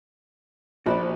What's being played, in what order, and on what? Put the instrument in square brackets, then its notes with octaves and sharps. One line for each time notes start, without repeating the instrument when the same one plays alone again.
[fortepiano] A#1 B5 [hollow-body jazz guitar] F#4 C5 D5